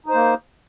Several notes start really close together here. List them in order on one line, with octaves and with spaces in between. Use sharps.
D#4 C5 A#3